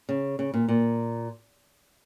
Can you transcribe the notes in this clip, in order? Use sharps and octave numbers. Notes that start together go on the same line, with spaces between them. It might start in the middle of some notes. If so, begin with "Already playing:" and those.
C#3
C#3
A#2
A#2